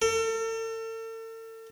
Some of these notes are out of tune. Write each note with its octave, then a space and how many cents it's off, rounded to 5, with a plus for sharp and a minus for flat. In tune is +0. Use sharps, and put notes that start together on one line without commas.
A4 +40